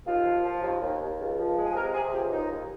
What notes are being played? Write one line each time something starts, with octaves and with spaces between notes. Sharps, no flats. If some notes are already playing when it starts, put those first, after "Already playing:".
D#2 F4
F3
F3
D#2
D#2
D#2
C#2
F3
G#3
G#4
C3 A#4
C3 G#4
G#4
C#2 G4
D#2 D#4
D#2